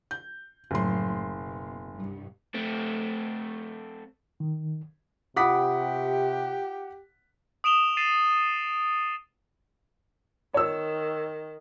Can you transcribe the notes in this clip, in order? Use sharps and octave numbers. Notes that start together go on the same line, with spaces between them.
G6
F#1 A2 F3 F#3 C6
B2
C2 G2
A3 C4
D#3
C3 F4 G4 F#5 B5 D6 D#6 B6
D#6 D7 E7 F7 G7
A6 C7 D#7 E7
D#3 C#5 E6